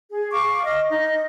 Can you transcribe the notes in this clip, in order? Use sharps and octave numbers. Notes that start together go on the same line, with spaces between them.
G#4
F5 C#6 D6
D#5 F6
D#4